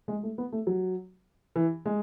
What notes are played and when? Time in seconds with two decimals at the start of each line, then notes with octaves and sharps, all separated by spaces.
0.08 G#3
0.23 A3
0.38 B3
0.52 A3
0.67 F#3
1.56 E3
1.86 G#3